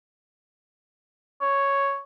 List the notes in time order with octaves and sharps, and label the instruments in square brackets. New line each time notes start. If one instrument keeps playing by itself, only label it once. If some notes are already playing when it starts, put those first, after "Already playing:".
[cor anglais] C#5